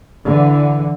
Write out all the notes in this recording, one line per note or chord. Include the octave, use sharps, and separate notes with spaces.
D3 E3